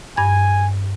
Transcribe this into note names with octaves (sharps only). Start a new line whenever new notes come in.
G2 G#5 G#6